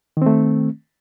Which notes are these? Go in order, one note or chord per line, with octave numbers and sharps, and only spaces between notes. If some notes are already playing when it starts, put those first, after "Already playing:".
D#3 A3 C4